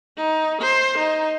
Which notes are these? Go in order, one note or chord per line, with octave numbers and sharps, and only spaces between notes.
D#4
C5
D#4